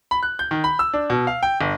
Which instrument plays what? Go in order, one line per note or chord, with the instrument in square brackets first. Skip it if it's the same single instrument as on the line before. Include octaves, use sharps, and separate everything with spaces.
[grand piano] B5
F#6
G6
D#3
B5
E6
D4
B2
F5
G5
G1